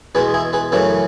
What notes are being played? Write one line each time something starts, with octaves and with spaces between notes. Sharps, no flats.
E2 B2 G#3 G#4 B4
E4 G#4
G#4 B4
F#2 C#3 E3 A3 G#4 B4